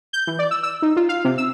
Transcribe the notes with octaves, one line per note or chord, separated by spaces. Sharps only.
G6
E3
D5
E6
E6
D#4
F4
F5
C3
E6